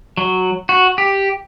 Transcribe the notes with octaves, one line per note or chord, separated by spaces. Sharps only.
F#3
F#4
G4